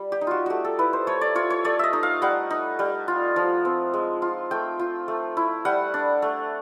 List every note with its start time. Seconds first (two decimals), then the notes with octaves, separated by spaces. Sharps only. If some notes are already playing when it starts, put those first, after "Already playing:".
Already playing: G3
0.12 G4
0.21 D#4
0.27 F4 F#4
0.46 A3 F#4 G4
0.65 A4
0.79 E4 B4
0.93 C5
1.07 A3 C#5
1.21 D5
1.35 F4 C#5
1.50 C#5
1.64 A3 D5
1.79 D#5 E5
1.93 D#4
2.03 F5
2.22 G3 F#5
2.51 D#4
2.79 G3
3.08 F4
3.36 F3
3.65 C4
3.94 G#3
4.22 F4
4.51 A3 G5
4.79 F4
5.08 A3
5.37 E4
5.65 G3 F#5
5.94 D4
6.22 A3